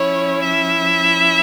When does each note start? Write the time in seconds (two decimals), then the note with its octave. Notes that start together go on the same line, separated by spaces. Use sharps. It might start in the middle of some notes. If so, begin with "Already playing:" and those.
Already playing: F3 C#4 E4 C#5
0.42 E5